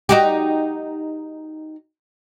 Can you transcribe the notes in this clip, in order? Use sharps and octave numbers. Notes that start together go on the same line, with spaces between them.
D#4 F#4 G4